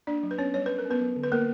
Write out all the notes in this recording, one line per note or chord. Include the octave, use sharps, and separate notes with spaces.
A#3 D4 D5
F#3
B4
B3 C#4 C#5
G3 C#5
C#4 B4
A#4
C#4
B3 B4
F#3
D3
B4
A#3 A#4